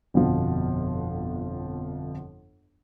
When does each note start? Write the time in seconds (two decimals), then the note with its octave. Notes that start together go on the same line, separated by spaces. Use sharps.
0.14 G1 F2 B2 F3